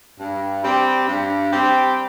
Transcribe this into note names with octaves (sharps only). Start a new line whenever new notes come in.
G2
G3 C4 G4
G2
G3 C4 G4